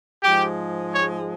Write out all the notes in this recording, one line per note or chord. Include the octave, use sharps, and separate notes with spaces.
G#2 F3 G#3 G4
C#5